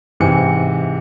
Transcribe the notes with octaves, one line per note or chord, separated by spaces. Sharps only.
G#2 C3 E3 G#5 C#7